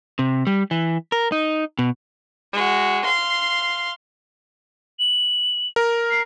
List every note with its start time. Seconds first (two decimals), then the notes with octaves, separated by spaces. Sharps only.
0.19 C3
0.47 G3
0.71 E3
1.12 A#4
1.32 D#4
1.79 B2
2.53 G#3 F#4
3.05 F5 C6
4.99 F#7
5.76 A#4
6.11 C7